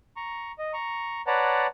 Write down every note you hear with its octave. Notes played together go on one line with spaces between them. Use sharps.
A#5 C#6
D#5
A#5 C#6
B4 C#5 D5 F#5 A5 A#5